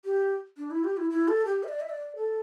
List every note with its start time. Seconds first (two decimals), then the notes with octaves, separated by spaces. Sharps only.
0.05 G4
0.58 D4
0.71 E4
0.84 G4
0.97 E4
1.10 E4
1.28 A4
1.45 G4
1.63 E5
1.68 D5
1.81 E5
1.90 D5
2.16 A4